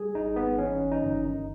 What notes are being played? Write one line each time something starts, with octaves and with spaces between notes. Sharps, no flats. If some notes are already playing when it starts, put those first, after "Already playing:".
Already playing: G3 G#4
G#1 D#4
G#1 B3
E3 C#4
G1
D#4
G1
D#3